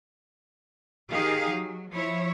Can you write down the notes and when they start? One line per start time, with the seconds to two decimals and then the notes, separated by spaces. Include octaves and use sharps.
1.10 D#3 D#4 G4 G#4 F5
1.50 F#3
1.91 F3 E4 C#5